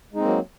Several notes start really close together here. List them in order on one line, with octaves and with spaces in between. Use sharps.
G#3 D#4 C4 A#3 F#3